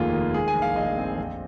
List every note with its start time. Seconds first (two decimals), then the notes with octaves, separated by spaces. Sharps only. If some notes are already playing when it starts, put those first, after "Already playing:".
Already playing: F1 D#2 D#3 A#3 F4 G#4
0.13 D#3
0.34 G#3 G#4
0.48 G#5
0.55 A#1
0.62 F5
0.76 A#1 D#5
0.98 C4
1.18 F2